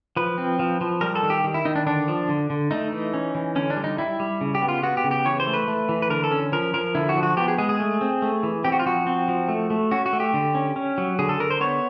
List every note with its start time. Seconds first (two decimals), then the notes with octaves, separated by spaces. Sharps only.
0.16 F3 B4
0.38 C4
0.59 F3
0.81 F3
1.01 G3 A#4
1.15 A4
1.23 D#3
1.30 G4
1.44 D#3
1.54 E4
1.65 D#3 D#4
1.76 D4
1.86 D3 D4
2.08 F3
2.29 D3
2.50 D3
2.71 A3 D#4
2.92 E3
3.13 C#4
3.35 E3
3.56 D3 C#4
3.70 D4
3.77 G3
3.84 D#4
3.98 G3 E4
4.20 G3
4.41 C#3
4.55 G4
4.62 B3
4.68 F4
4.83 B3 F#4
4.97 G4
5.04 C#3
5.11 G4
5.25 E3 C#5
5.40 C5
5.47 A3
5.54 B4
5.68 A3
5.89 E3
6.02 B4
6.10 D3 A#4
6.24 A4
6.32 C#4
6.52 F3 A#4
6.74 F3 A#4
6.95 D3 E4
7.09 F#4
7.16 F3
7.23 F#4
7.37 B3 G4
7.48 G#4
7.58 G#3 G#4
7.69 G#4
7.80 A3
8.01 C4
8.22 A3
8.43 E3
8.64 C4 G4
8.72 F#4
8.79 F4
8.86 F3 F#4
9.07 C4
9.28 F3
9.49 A3
9.70 A3
9.91 C#4 F#4
10.06 F#4
10.13 A3
10.20 G4
10.34 D3
10.55 C#4
10.76 C#4
10.98 F#3
11.19 D3 G#4
11.29 A4
11.40 D3 A#4
11.50 C5
11.61 B3 C#5